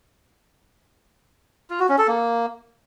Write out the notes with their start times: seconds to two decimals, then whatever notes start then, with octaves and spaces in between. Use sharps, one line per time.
1.70 F4
1.80 F#4
1.89 C#4
1.98 A4
2.08 A#3